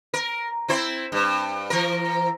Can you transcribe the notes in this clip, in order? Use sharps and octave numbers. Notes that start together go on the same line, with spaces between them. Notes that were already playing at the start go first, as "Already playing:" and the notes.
A#4
C4 E4 C5
G2
E3 A#4